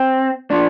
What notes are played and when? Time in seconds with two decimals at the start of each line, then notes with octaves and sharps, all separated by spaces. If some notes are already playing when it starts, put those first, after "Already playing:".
Already playing: C4
0.50 F3 D4